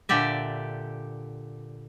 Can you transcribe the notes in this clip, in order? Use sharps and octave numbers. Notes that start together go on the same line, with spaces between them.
A#2 D3 G4 D5 E5